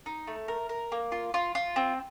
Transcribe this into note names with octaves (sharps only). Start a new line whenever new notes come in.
D#4
A3
A#4
A#4
A#3
F4
F4
F4
C4